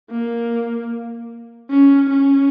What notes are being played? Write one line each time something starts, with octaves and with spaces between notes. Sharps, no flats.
A#3
C#4
C#4